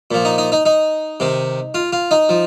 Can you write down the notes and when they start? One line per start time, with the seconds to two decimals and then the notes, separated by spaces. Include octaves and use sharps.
0.11 A#2 F3
0.25 D#4
0.38 D#4
0.52 D#4
0.65 D#4
1.20 C3 D#3
1.74 F4
1.93 F4
2.11 D#4
2.29 F3